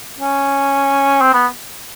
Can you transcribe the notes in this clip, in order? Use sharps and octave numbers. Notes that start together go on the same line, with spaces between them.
C#4
C4
B3